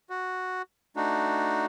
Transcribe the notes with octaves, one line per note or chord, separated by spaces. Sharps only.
F#4
A3 D4 D#4 F#4